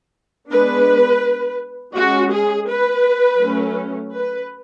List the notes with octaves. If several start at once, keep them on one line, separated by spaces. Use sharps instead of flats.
G#3 B3 D4 B4
G#3 C#4 F#4
G#4
B4
F#3 A3 C#4
B4